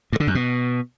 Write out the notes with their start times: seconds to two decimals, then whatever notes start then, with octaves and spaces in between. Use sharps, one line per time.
0.13 G2
0.20 D3
0.27 F#2
0.35 B2